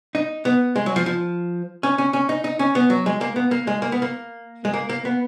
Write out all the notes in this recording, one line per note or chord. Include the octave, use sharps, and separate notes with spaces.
D#4
B3
G#3
F#3
F3
F3
C#4
C#4
C#4
D#4
D#4
C#4
B3
F#3
G#3
A#3
B3
A#3
G#3
A#3
B3
A#3
G#3
A#3
A#3
B3